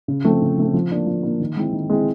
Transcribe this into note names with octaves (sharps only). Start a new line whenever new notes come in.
C#3
F3 A3 C4
C#3
F3 A3 C4
F3
A#3 D4
F3
A#3 D4
D#3
G#3 C4 E4
D#3
G#3 C4 E4